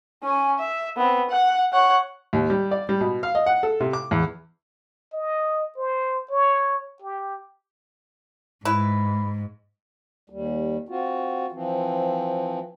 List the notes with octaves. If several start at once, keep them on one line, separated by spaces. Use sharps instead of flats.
C#4 G#5
E5
B3 C4
F#5
C#5 F#5
D#2
G3
D5
G3
B2
F5
D#5
F#5
A4
C3
D6
E2
D#5
C5
C#5
G4
G#2 E4 B4
D#2 G3
C4 F4 F#4
E3 F3 C4